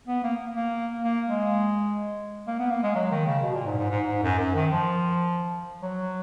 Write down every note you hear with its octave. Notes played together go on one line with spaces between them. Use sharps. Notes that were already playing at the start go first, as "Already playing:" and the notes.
B3
A#3
A#3
A#3
G#3
A#3
B3
A#3
G#3
F#3
D#3
C#3
B2
A#2
G#2
G#2
G#2
G#2
F#2
F#2
D#3
F3
F#3